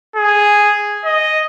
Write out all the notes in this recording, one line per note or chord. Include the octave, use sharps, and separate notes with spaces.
G#4
D#5